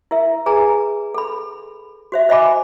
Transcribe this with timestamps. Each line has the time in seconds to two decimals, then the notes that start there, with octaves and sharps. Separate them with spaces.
0.11 E4 A#4 E5
0.46 G#4 B4 G#5 A#5
1.14 A4 B5
2.12 F#4 C5 E5
2.29 C5 D#5 E5 G#5 B5 D6